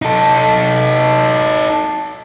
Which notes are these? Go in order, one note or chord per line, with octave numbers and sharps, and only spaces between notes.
D#4 A4